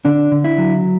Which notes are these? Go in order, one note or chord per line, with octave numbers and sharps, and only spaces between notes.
D3 D4
D3
E4
F#3